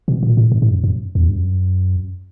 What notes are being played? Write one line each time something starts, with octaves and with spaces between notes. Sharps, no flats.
B2
A#2
A2
G#2
G#2
F#2
F#2
E2
G2
F#2